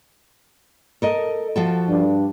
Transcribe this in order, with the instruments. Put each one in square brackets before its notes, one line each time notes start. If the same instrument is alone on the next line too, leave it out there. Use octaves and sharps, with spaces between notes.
[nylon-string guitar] A4 A#4 D#5
F3 F#4 A4
[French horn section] G2 D4